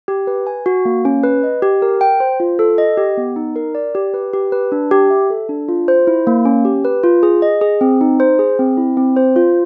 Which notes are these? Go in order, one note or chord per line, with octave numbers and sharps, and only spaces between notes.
G4
B4
G#5
F#4
A#3
C#4
B4
D#5
G4
A#4
G5
C5
F4
A4
D#5
G4
B3
D#4
A#4
D5
G4
B4
G4
B4
D4
G4
E5
A4
D4
F4
C5
E4
A#3
C#4
G4
B4
F4
G#4
D#5
G#4
C4
D#4
C5
G#4
C4
E4
C4
C5
F4